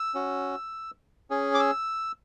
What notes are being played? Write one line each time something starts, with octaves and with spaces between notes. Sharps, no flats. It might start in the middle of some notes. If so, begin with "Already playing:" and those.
Already playing: E6
C#4 F#4
C#4 G#4
D6
E6